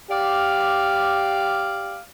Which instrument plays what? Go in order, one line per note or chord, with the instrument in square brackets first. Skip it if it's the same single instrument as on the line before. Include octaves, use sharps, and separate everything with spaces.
[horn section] G4 D5 F5